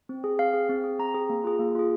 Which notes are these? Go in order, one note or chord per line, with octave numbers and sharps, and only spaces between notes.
C4
G#4
C4 F5
G#4
C4
G#4
C4 A#5
G#4
A#3
F4 G#4
A#3
F4 G#4